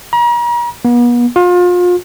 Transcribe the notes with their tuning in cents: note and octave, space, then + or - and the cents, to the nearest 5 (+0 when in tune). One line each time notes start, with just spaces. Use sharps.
A#5 +40
B3 -40
F4 +35